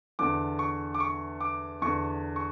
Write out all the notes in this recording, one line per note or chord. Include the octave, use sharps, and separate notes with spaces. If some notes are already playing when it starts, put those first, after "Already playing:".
E2 D3 D6
C#6
D6
C#6
D6
E2 D3 C#6
C#6